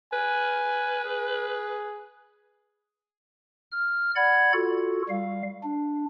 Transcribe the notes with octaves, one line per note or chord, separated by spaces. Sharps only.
B4 G#5
G#4
F6
D5 F#5 B5 G#6
F4 F#4 A4
G3 F5
D4